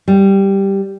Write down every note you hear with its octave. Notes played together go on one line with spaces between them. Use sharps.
G3